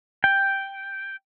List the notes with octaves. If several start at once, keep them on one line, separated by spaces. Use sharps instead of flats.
G5